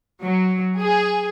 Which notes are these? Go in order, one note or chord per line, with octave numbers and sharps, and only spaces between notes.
F#3
G#4